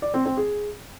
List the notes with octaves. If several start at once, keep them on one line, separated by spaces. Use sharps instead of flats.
D5
C4
C4
G#4